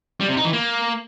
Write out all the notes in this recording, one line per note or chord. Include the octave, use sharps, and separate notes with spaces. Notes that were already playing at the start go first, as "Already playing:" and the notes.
G3
C3
D#4
E3
A#3